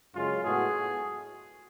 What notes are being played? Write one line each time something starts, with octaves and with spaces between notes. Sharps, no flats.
F#2 C#3 G#3 C#4 F4
A2 G#3 B3 F#4 G#4 A4